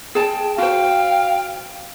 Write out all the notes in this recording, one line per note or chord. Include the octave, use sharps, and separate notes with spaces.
G#4 G5 A5
F#4 C5 F5 G5